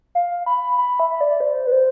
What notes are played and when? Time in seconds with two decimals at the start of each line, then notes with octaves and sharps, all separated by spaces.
0.15 F5
0.46 B5
0.78 B5
1.00 E5
1.21 D5
1.40 C5
1.67 B4
1.72 C5